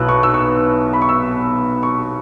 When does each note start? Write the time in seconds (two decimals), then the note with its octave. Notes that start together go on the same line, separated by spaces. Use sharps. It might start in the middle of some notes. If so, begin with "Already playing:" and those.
Already playing: B1 B2 B3 E4 E6 F#6
0.09 C#6
0.23 E6
0.34 C#6
0.93 B5
1.02 C#6
1.09 E6
1.83 C#6